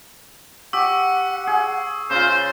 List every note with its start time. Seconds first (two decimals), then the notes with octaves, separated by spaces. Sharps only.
0.73 G4 F#5 C#6 E6
1.47 G#4
2.10 C#3 F4 C5